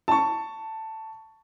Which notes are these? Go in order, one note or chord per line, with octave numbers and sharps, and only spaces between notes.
A5 C#6